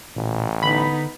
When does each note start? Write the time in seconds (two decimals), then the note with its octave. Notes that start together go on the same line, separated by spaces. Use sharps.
0.16 A1 A#2
0.63 D3 B3 D#4 B5